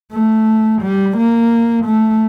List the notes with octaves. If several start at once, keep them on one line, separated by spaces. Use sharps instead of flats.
A3
G3
A#3
A3